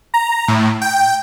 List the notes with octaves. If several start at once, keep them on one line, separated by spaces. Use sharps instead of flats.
A#5
A2
G5